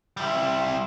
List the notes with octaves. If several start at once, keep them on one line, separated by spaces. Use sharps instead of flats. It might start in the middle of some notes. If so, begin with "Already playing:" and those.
G3 E4